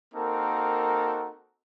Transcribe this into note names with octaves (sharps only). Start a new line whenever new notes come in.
A#3 C4 D#4 F#4 A4 A#4